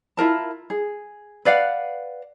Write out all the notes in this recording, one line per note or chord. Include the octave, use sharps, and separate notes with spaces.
E4 F4 A#4 A5
G#4
B4 D5 F5 F#5